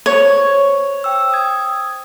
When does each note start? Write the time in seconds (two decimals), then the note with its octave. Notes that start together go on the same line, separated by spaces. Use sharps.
0.06 C5 C#5
1.04 C5 G5 E6
1.32 D#6 G#6